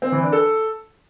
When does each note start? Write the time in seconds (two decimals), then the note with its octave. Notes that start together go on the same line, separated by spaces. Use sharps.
0.02 C4
0.12 E3
0.22 D4
0.32 A4